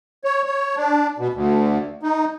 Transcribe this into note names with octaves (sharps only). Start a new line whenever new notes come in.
C#5
C#5
D4
B2
D2
D#4